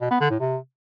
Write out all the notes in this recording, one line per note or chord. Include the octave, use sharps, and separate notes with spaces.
B2
B3
D3
A2
C3